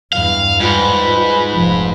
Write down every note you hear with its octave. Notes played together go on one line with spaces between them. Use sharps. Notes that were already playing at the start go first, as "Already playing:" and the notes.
E2 G2 F5
G#2 G3 F4 B4
F1 F3